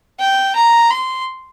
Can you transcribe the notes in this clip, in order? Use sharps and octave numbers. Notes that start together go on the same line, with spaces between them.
G5
A#5
C6